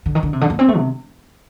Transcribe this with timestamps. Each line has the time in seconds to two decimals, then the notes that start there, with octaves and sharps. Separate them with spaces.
0.06 D3
0.15 D#3
0.23 D3
0.33 C3
0.41 D3
0.50 A#3
0.59 C4
0.68 A3
0.77 C3